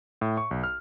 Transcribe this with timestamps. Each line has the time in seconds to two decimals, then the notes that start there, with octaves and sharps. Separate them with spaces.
0.21 A2
0.37 C#6
0.51 B1
0.64 F6